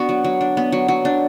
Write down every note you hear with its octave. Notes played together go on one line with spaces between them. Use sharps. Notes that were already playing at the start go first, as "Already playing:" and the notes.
Already playing: B3 D4 F#4
F#3
F#3
D4
B3
F#3
F#3
D4